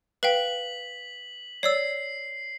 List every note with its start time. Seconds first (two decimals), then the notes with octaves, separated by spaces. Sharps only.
0.23 B4 F5 G5 B6 F#7
1.63 C#5 D5 E6 C7